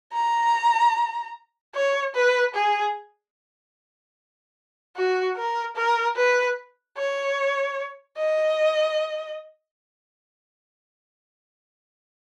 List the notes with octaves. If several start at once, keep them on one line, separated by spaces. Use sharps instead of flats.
A#5
C#5
B4
G#4
F#4
A#4
A#4
B4
C#5
D#5